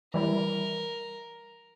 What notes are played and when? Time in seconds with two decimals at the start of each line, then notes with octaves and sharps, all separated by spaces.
0.14 E3 G3 E4 A#4